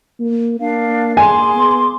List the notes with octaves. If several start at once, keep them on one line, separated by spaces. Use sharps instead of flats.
A#3
A#3 D4 F5
G#4 G#5 C6 D6
B3